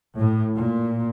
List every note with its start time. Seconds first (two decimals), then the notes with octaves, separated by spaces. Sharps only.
0.17 A2
0.55 A#2